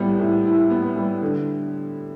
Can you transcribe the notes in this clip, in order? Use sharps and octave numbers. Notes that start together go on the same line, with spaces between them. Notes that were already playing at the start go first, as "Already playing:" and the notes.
Already playing: A2 G3 B3
A2
E4
B3
G3
D3